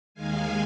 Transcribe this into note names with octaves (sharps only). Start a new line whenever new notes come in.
D#2 D#3 G#3 F5 G#5